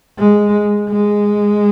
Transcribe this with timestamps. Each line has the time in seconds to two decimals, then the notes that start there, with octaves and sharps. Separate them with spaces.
0.18 G#3
0.89 G#3